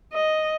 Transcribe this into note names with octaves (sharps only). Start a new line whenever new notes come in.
D#5